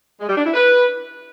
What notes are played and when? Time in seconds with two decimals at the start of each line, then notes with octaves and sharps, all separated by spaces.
0.20 G#3
0.29 G3
0.37 D4
0.46 E4
0.54 B4